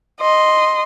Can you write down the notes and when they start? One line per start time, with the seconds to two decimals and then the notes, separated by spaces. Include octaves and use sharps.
0.21 D#5 C6